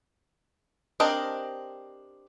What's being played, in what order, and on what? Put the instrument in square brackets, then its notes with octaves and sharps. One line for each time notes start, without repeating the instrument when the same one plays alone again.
[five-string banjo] C4 D4 G4 A#4 D#5